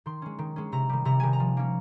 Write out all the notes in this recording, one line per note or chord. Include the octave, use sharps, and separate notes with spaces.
D#3 C6
G#3 C#4
D#3
G#3 C#4
C3 A#5
D#3 G3
C3 A#5
D#3 G3 G#5
A#5
F3
A#3 C#4